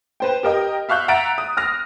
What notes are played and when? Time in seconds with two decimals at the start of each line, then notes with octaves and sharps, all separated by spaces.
0.20 B4 C5 G5
0.43 G4 A#4 D#5 G5
0.89 E5 F5 C#6 F#6 G6
1.08 E5 F#5 A#5 F#6 A6 D7
1.38 D#6
1.57 D#6 F6 A#6